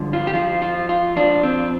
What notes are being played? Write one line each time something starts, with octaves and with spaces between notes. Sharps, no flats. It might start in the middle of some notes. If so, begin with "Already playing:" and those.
Already playing: G2 D3 F3
F4
G4
F2 F3 F4
F4
F4
F2 F3 D4
C4